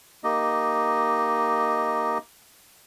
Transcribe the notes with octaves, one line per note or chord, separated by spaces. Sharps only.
A#3 D#4 G4 D#5